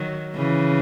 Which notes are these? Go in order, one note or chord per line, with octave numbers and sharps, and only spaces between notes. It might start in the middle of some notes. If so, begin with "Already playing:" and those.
Already playing: D#3 F#3
C#3 E3